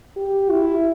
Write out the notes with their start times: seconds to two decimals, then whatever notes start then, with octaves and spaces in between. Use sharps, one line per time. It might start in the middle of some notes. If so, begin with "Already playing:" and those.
0.17 G4
0.50 E4